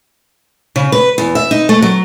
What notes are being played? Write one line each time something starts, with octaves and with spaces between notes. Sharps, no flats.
C#3
B4
E2
E5
D#4
A3
F#3